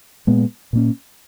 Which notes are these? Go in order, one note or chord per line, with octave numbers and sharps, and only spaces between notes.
A#2 G#3 B3
A#2 A#3 C#4